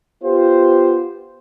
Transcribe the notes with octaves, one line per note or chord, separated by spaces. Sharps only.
B3 F4 G4 C5